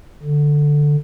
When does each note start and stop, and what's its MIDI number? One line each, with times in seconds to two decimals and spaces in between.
0.22 0.96 50